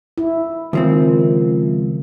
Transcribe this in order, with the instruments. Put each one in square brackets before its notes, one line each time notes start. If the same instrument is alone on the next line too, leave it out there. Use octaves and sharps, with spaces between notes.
[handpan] E4
[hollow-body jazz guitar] C#2 F3 C4 [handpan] D#3